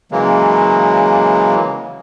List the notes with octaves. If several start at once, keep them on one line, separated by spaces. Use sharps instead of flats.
C#3 E3 F#3 G#3 A#3